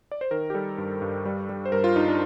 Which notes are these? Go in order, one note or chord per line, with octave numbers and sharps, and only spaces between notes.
D5
C5
D#3 A#4
G4
G3 A4
G2
G2
G3
G3
C5
G2 A#4
F4
G2 D#4
D4